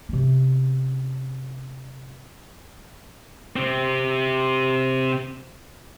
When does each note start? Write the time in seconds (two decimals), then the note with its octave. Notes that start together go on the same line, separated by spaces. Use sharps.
0.09 C3 C#4
3.56 C3 C4